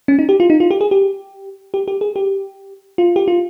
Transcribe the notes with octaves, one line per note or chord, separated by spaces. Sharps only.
C#4
D#4
G4
F4
D#4
F4
G4
G#4
G4
G4
G4
G#4
G4
F4
G4
F4